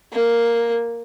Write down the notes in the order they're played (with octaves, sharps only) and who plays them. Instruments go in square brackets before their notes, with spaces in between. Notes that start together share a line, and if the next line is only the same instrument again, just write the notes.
[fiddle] A#3